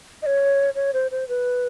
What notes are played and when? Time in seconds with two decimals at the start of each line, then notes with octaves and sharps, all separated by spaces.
0.22 D#5
0.26 C#5
0.75 C#5
0.93 C5
1.11 C5
1.28 B4